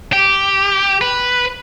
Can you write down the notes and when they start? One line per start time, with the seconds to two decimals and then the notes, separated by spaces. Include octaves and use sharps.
0.13 G4
1.01 B4